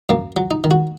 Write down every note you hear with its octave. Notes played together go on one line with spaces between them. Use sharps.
F#2 A#3
F#3
D#4
D#3
F#4